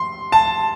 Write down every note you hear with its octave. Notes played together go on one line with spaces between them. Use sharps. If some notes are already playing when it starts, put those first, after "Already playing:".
Already playing: C6
A5